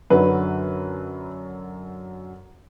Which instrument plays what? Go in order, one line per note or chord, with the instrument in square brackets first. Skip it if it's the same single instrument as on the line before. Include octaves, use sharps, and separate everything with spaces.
[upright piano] F#2 D3 F#3 B4